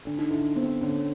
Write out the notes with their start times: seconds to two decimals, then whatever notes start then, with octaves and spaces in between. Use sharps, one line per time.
0.05 D3 D4
0.19 D#4
0.31 D3 E4
0.56 B3 C4
0.81 D3 C#4